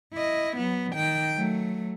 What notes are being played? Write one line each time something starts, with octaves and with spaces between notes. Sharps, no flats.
E4 D#5
F#3 B3
D#3 G5
F#3 A3